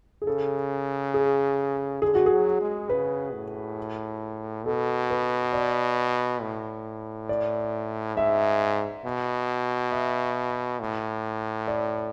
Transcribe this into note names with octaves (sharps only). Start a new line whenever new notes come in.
G#4
C#3 A4
G#4
D3 G#4
F#4
F#3 G#4
G#3
C#3 B4
A2
B2 A4
B4
D5
A2
D5
G#2 E5
B2
E5
A2
D5